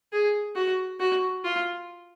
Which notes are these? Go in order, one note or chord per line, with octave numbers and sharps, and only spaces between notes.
G#4
F#4
F#4
F4